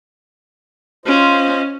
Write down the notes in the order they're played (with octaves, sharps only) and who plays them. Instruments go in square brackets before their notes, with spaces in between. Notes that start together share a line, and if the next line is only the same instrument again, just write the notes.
[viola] C#4 [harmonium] F4 C5 D#5